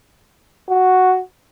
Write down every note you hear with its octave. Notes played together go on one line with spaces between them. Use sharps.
F#4